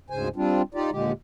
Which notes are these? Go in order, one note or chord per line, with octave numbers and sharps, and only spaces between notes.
D2 G#2 C#3 C5 G#5
G3 C4 D4 F4
D#4 F4 G4 D5
D#2 A#2 D3 G#3 G4